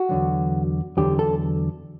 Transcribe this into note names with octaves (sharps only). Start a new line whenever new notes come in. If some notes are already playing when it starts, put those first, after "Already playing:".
Already playing: F#4
E2 D3 F#3
E2 D3 F#3 G4
A4